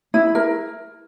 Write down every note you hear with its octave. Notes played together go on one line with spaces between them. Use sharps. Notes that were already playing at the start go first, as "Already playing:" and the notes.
E4
A#4